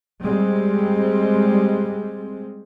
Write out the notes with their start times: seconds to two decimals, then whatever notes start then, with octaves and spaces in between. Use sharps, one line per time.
0.24 G3 G#3 C4